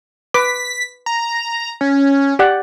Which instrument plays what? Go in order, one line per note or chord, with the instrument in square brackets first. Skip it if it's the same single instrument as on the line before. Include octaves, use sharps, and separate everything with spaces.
[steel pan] B4 D6 [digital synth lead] B6
[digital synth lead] A#5
C#4
[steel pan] G4 D5 F#5